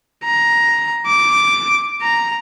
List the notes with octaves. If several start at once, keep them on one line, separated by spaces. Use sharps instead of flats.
A#5
D6
A#5